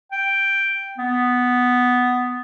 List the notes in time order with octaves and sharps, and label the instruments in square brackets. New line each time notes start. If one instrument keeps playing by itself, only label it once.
[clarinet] G5
B3